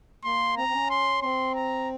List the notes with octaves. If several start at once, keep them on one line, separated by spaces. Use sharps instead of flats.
A#3 C6
C4 A#5
C4
C#4
C6
C4 C6
A#5